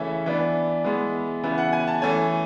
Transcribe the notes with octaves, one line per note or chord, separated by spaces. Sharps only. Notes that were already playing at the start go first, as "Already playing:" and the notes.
Already playing: C#3 E3 A3 C#4 E4 E5
E3 B3 D4
E3 G#3 B3
C#3 E3 B3 E4
F#5
G#5
A5
E3 A3 C#4 G#5